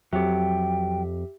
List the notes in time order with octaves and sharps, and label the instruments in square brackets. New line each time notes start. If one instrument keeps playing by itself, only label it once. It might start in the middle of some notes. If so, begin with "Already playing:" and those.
[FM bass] F2 [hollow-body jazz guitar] F#3 [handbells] G4 E5 [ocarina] G5